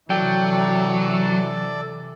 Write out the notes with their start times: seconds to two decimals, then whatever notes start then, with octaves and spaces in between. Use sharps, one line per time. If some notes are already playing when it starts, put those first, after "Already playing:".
0.10 C3 E3 F#3 A4 D5 G5